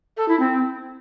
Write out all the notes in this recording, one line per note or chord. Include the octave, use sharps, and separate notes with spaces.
A4
E4
C4